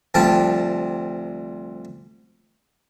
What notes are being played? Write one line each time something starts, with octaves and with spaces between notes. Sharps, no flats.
D2 C3 F3 G3 A5